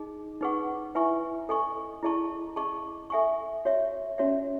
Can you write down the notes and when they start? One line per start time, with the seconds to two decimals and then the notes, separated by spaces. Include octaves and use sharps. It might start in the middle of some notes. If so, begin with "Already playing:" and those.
Already playing: D#4 G#4 D#5
0.41 D#4 G#4 B4 F#5 C#6
0.95 E4 B4 E5 G#5 C#6
1.49 A4 D#5 G#5 C#6
2.03 E4 G#4 D#5 A5 C#6
2.56 G#4 D#5 A5 C#6
3.10 A4 E5 G#5 C#6
3.65 F#4 C#5 E5
4.18 C#4 F#4 C#5 E5